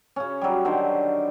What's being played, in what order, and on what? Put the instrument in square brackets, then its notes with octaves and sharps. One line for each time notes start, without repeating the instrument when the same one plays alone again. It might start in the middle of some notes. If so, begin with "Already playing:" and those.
[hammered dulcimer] C#3 C#4
F#3 G3
D3 D#3 C5